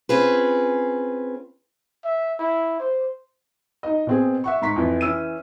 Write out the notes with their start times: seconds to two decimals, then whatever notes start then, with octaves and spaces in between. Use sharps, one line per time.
0.09 C4 C#4 F4 G#4 B4
2.04 E5
2.39 E4
2.80 C5
3.83 D#4 D#5
4.07 B2 C4 G#4
4.44 E5 F#5 C#6
4.62 G#2 A#5 C6 C#6 B6
4.76 F2 E3
5.01 E3 C#4 E6 D#7